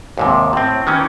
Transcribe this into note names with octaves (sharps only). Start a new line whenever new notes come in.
D#2 G#2 C3
A2 C4
D#3 E3 C#4